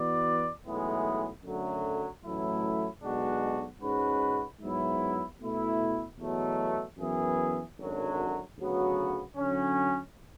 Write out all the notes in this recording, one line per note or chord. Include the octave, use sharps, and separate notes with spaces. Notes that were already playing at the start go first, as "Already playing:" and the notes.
Already playing: E3 B3 F#4 B4 D5
B1 A2 E3 G#3 B3
F#2 D3 F#3 A3
A1 A2 F#3 A3 E4
B1 B2 G#3 D4 F#4
G#2 G#3 C#4 F#4 B4
G#2 F#3 B3 E4
B2 A3 E4
E2 B2 F#3 A3
F#2 E3 B3 E4 G#4
G#1 F#2 D3 F#3
D2 C#3 F#3 B3 F#4
D3 F#3 C#4